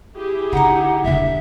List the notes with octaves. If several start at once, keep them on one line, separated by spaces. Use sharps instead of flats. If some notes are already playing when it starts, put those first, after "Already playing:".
E4 G4 G#4
D3 D#4 F#5 A#5
E1 D3 E5